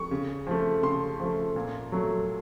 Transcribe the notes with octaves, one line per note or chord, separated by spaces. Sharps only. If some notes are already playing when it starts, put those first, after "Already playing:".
Already playing: C#6
C#3
F3 A3
C#3 C6
F3 A3
A#2
F#3 A3